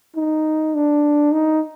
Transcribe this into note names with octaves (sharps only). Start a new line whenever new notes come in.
D#4
D4
D#4